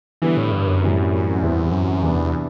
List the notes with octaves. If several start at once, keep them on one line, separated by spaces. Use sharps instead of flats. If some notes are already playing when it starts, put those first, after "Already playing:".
D3 E3 G3 B3
A2
G2
F#2
A2 E3 G3 C4 E4
E2 E3 G3 C4
F#2
E2 C3 E3 B3 D4